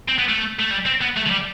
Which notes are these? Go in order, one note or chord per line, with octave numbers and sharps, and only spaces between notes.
C4
B3
A3
A3
G3
C4
B3
A3
F3
G3